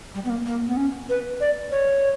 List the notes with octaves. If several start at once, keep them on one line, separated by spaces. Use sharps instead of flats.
G3
B3
A#3
A#3
B3
C#4
B4
D5
C#5